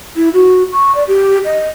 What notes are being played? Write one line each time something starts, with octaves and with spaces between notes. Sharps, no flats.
E4
F#4
C#6
D5
G4
D#5